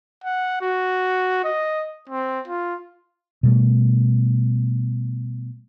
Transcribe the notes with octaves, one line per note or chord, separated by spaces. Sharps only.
F#5
F#4
D#5
C4
F4
B2 G3 A3